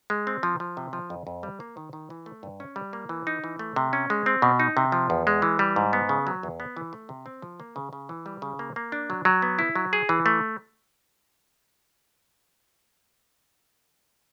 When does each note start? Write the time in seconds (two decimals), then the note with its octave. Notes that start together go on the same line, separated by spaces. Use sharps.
0.10 G#3
0.27 C4
0.43 F3
0.60 F3
0.77 C3
0.93 F3
1.10 F2
1.27 F2
1.43 G3
1.60 A#3
1.77 D#3
1.93 D#3
2.10 E3
2.26 A3
2.43 G2
2.60 C#4
2.76 G3
2.93 A#3
3.09 E3
3.27 D#4
3.44 E3
3.59 A3
3.76 C3
3.93 C#4
4.10 G#3
4.26 C4
4.42 B2
4.60 D#4
4.77 C3
4.92 F3
5.10 E2
5.27 G#3
5.42 E3
5.59 G3
5.76 G#2
5.93 B3
6.09 C#3
6.27 F#3
6.43 E2
6.60 B3
6.77 E3
6.93 A3
7.09 C3
7.26 C4
7.42 F3
7.60 A#3
7.76 C#3
7.93 C#3
8.09 E3
8.26 G3
8.42 C#3
8.59 A#3
8.76 A#3
8.92 D4
9.10 F#3
9.25 F#3
9.42 B3
9.59 E4
9.75 F#3
9.93 G#4
10.09 E3
10.26 A3